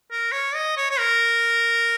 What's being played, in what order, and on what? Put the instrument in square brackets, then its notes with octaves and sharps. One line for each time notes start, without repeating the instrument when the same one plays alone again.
[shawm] A#4
C#5
D#5
C#5
C#5
A#4